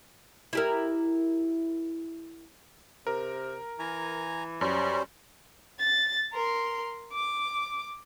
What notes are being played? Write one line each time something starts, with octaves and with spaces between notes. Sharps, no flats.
E4 G4 A#4
C3 A#4
E3 G#5 A#5
F#2 G3 C#4 C5
A6
A#4 C6
D6